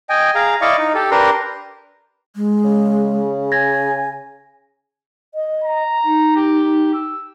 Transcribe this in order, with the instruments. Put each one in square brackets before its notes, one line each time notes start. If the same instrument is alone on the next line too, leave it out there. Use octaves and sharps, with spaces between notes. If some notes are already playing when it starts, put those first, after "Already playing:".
[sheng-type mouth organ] D#5 G5 G#5
G#4 F5 A#5
E4 D5 D#5 F5 C#6
D#4
G4 A4
D4 G4 A#4 B4 A#5 C6
[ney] G#3
[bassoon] C#3
[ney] G#5 [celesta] G#6 A#6
[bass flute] D#5
[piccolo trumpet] A#5
[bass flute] D#4
[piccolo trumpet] G4
E6